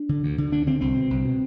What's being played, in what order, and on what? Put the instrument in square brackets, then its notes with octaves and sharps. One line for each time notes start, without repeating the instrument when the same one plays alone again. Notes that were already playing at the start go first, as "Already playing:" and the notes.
Already playing: [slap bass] D4
D3
D2
D3
D2 D4
D3 C4
C2 C4
B2
C2
B2